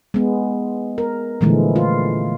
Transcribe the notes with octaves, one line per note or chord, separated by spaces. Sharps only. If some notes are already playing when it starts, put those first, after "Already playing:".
G#3 B3
A#4
A#2 D3 E3 F3 G#3 A3
F4